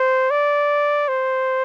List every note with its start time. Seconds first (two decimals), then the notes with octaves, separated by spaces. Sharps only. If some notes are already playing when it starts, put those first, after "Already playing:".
Already playing: C5
0.31 D5
1.08 C5